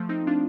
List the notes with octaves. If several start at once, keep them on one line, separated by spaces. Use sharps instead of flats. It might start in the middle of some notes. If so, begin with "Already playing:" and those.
Already playing: F3 A3
C4 D#4
D4 F4